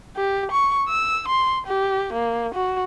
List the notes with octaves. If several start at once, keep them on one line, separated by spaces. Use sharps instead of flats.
G4
C#6
E6
C6
G4
A#3
F#4